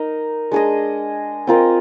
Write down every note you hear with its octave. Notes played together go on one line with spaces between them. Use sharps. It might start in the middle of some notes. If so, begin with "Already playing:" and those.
Already playing: D#4 A#4 D#5
G#3 D4 G#4 D#5
C4 F4 A#4 D#5